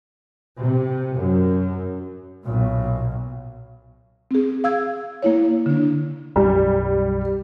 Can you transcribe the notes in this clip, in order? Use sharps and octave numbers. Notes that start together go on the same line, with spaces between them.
C3
F#2
B1 A#2
C4 G#4
F5 E6 G#6
A#3 E4 C#5
D3 D4
B1 F#2 G3